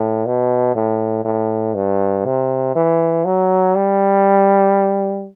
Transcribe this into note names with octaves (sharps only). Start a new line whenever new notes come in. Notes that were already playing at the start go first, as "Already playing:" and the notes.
Already playing: A2
B2
A2
A2
G2
C3
E3
F#3
G3